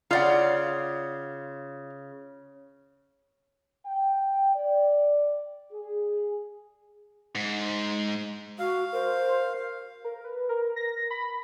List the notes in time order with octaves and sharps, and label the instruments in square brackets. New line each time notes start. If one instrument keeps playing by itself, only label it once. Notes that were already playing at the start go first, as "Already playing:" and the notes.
[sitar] C#3 [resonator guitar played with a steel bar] F4 D5 F#5
[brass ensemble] G5
D5
G#4
[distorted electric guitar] G#2
[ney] F#4 [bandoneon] F5
[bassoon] A#4 [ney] C5
[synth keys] A#4
B4
A#4
A#6
B5